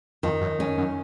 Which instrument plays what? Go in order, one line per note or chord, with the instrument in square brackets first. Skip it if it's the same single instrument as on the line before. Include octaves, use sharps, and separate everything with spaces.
[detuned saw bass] F2 [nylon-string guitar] D#3
[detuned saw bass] F#2
[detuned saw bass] F2 [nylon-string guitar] C#4
[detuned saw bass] F#2